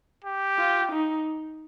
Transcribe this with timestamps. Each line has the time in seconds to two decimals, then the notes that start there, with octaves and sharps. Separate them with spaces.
0.25 G4
0.59 F4
0.92 D#4